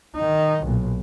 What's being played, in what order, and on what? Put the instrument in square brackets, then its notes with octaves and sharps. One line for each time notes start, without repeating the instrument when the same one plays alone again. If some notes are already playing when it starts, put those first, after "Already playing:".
[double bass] D#3 D#4
B1 A#2